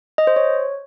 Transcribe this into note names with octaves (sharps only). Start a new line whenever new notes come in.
D#5
C5
C#5